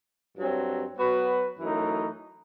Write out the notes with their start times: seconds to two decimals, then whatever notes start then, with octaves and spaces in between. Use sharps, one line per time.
0.36 G2 F#3 C4
0.97 F#3 B3 F#4 B4
1.58 F#2 E3 A3 D#4